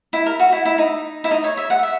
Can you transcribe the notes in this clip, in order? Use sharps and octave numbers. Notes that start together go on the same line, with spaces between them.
E4
A#4
F#4
E4
E4
D#4
E4
D#4
C#5
E5
F#5
E5